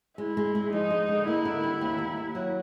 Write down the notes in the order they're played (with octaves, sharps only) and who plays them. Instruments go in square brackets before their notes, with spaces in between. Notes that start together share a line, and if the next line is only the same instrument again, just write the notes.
[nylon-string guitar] G#3 [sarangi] E4
[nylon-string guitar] G#3
G#3
[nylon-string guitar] F3 [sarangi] D#4
[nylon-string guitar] G#3
D3
[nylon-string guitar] A#3 [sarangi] E4
[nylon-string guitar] D3
G3
D#2
D#2
A#3
F#3